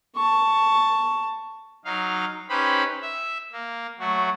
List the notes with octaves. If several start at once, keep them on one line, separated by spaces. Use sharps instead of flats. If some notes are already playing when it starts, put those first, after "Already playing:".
A5 C#6
F#3 D#4 F5
C#4 D#4 G4 B4 C5 B5
E5
A#3
F#3 A3 F#4